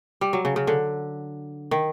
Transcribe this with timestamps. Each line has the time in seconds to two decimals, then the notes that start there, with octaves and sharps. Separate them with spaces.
0.21 G3
0.33 F#3
0.45 C#3
0.56 C#3
0.67 D3
1.71 D#3